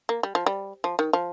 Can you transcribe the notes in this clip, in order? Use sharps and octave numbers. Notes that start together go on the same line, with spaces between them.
A#3
G3
F3
G3
F3
D#3
F3